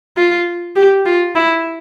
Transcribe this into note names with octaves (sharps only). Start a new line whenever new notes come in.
F4
G4
F4
E4